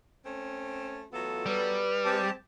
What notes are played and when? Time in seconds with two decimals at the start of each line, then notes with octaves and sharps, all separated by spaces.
0.24 A3 C4 C#4
1.12 E3 F#3 A3 B3 F4 A4
1.46 G3 B4
2.05 G#3 C4 G4 A5